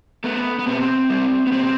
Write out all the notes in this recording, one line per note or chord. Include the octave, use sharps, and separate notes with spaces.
A3 B3
B3
B2 C4
G3
B3
B2 C4